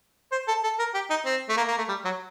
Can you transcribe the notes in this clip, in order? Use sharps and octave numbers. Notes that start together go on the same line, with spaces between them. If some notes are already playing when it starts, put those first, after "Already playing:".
C5
A4
A4
A#4
G4
D#4
C4
A3
A#3
A#3
A3
G3
F#3